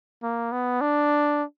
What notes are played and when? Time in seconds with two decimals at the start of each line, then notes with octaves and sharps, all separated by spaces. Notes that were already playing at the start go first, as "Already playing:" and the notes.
0.23 A#3
0.52 B3
0.81 D4